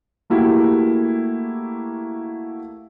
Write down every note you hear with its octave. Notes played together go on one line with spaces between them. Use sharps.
A3 A#3 E4 F#4 G4